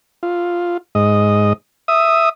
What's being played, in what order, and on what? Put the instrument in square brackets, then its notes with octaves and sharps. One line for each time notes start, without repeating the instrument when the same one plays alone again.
[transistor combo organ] F4
G#2 D#5
E5 D#6